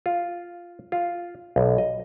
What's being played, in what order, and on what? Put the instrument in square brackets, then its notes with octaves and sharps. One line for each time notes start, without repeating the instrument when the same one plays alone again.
[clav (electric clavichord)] F4
F4
B1
D#5